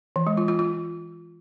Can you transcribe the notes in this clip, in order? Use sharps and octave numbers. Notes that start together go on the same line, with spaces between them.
E3
G#3
F4
F4
F4